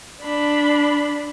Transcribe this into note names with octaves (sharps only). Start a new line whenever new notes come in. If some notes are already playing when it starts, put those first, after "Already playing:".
D4 B5